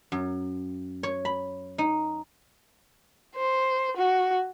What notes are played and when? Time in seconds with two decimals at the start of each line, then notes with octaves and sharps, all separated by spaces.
0.12 F#2
1.03 C#5
1.25 B5
1.78 D#4
3.35 C5
3.97 F#4